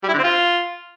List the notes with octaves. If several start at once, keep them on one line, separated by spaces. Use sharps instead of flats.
G3
E4
D3
C4
F4